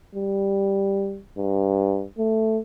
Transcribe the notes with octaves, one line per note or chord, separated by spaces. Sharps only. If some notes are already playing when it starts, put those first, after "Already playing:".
G3
G2
A3